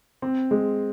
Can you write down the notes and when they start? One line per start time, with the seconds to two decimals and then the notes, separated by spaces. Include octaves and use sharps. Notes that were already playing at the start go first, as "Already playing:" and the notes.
0.22 C4
0.51 G#3